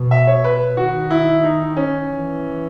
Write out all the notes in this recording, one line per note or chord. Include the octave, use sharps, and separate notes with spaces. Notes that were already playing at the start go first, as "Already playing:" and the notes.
Already playing: B2
E5
C#5
B4
D#3 F#4
E4
D#4
C#4
E3